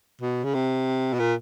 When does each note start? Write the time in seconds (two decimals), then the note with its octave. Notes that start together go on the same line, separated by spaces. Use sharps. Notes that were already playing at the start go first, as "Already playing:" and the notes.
0.21 B2
0.44 C#3
0.54 C3
1.13 B2
1.19 A#2